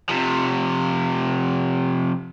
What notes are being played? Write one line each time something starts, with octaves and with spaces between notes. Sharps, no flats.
C3 F3